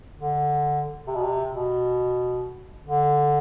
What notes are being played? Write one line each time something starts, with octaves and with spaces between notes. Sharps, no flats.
D3
C3
B2
C3
B2
D3